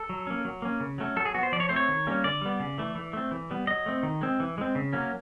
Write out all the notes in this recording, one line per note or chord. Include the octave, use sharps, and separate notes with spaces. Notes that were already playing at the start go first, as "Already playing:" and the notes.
Already playing: A4
F#3
A#3 C#4
F#3
A#3 C#4
C#3
F#3 A3 C#4
F#3 A4
G#4
B3 F#4
C5
F3 D5
C#5
A3 C4 C5
C#5
D#3
G3 A#3 C#4
D3 D5
G3 B3
C#3
E3 A3
E3
A3 C4
E3
G3 B3
F#3 D#5
A3 C4
D#3
G#3 C4
E3
G#3 C4
C#3
F#3 A#3 C#4